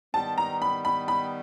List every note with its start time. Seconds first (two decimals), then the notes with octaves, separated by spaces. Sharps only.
0.14 D#3 G3 B3 A5
0.38 A#5
0.62 B5
0.85 B5
1.08 B5